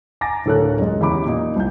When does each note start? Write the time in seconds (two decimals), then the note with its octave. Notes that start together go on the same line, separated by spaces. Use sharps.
0.21 G#5 A#5 D6 A6 A#6
0.46 D1 D3 A4 A#4 C#5 F#6
0.78 F#1 G#3
1.01 E2 C#4 G4 B5 D6
1.26 A#2 D#4
1.56 C2 G6